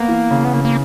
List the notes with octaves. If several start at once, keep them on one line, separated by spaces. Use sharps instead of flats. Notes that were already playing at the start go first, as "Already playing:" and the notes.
Already playing: A#3 B3
E3
C#3
B3
C#3 A#3
A#3